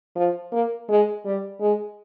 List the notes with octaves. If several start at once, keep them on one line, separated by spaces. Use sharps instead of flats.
F3
A#3
G#3
G3
G#3